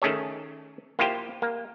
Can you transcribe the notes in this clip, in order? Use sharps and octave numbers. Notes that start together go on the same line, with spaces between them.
D#3 A3 C#4 G#4 A4 C#5
A#3 E4 F4 G4 C5 G5
A#3